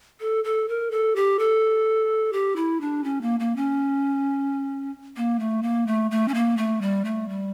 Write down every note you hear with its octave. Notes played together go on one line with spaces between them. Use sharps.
A4
A4
A#4
A4
G4
A4
G4
E4
D4
C#4
A#3
A#3
C#4
A#3
A3
A#3
A3
A3
C#4
A#3
A3
G3
A3
G3